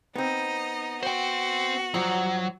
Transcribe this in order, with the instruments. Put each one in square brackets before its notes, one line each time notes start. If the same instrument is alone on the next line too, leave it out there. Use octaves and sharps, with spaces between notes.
[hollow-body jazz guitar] B3 C4 [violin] D#4 D#5
[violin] F#4 [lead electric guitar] C5 G5
[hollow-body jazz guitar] G2 F3 [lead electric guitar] F#3